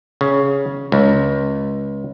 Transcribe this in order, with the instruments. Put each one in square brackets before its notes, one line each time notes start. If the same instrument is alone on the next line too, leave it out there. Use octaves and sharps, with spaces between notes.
[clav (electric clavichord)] C#3
C#2